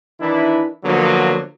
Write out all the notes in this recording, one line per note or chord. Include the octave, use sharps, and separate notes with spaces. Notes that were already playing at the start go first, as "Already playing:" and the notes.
D#3 E3 D4 E4
D3 F3 F#3 A#3 B3